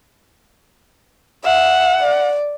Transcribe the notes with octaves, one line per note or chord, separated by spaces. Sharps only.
E5 F#5
D5